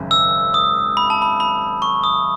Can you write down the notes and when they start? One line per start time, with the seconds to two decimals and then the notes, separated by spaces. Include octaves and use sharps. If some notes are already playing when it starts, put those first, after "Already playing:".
Already playing: G#1 F#2 C#3
0.11 E6
0.54 D#6
0.97 B5
1.10 A5
1.22 B5
1.40 B5
1.82 C#6
2.04 D#6